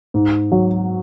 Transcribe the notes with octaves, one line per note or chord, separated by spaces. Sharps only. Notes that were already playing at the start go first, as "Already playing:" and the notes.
G#2
F#3